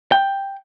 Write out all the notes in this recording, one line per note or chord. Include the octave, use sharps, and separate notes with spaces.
G5